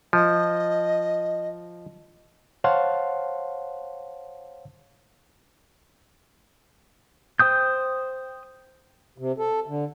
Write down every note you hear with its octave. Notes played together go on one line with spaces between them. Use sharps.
F3 D#5
C5 C#5 F5 F#5 A5 C6
C5 G5 D#6 G6
C3
A4
D3